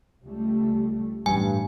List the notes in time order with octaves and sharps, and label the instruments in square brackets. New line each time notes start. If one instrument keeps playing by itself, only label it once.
[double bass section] C#2 G3 A3
[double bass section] A1 [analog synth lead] G2 [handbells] G#5